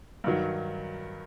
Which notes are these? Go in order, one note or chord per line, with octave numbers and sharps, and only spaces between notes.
G2 D#3 F#3